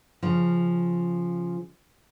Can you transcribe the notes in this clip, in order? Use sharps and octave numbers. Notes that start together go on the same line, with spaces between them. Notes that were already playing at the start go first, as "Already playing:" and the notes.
C#3 F3